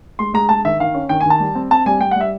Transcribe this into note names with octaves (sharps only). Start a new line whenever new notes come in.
G#3 C6
G#3 A#5
G#3 A5
D#3 E5
D#3 F5
C#4
D#3 G5
G#5
D#3 A5
G3
C4
C4 A5
G3 G#5
G3 G5
F#5
G3 E5